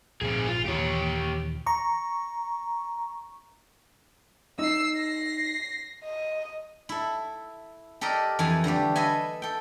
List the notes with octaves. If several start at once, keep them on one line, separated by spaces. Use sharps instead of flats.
A#1 G#2 C4 G#4
F4
D#2 A#2 E3 G4 C#5
A#5 C#6
D#4 E6 C7
A#6 C7
D#5
E4 A4
G4 A4 A#4 D5 D#5
F2 E3 G#5 A5
D3 G3 A3 G4
A4 B4 D#5 E5 G#5
A4 G5